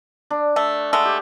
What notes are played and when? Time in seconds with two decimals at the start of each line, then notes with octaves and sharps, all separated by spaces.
0.30 D4
0.56 A3
0.93 G#3 A3 F#5
1.05 G4